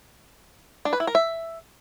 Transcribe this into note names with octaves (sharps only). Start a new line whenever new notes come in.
D4
B4
E4
A#4
E5